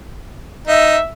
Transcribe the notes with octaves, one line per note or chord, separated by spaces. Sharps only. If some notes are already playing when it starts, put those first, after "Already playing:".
D#4 E5